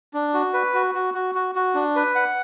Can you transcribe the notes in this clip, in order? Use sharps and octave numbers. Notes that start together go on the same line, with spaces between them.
D4
F#4
B4
F#4
F#4
F#4
F#4
F#4
D4
B4
F#5